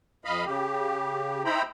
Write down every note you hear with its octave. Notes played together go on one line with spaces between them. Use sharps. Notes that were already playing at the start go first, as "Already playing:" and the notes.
F2 D#5 F5 B5
C#3 G4
D#4 E4 C5 G5 A#5 B5